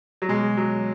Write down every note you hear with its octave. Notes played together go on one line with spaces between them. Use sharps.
F#3
B2 G#3
F#3